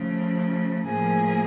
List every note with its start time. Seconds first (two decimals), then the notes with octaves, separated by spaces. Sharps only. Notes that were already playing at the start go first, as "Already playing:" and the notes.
Already playing: C#3 F3 A3
0.85 A2 F3 A#3 G#4